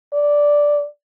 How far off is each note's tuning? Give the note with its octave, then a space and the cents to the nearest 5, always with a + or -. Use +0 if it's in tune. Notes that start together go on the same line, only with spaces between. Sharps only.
D5 -5